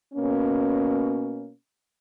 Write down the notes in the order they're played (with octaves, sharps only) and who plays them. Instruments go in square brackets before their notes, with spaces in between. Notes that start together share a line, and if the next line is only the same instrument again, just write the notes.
[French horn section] B2 A#3 C#4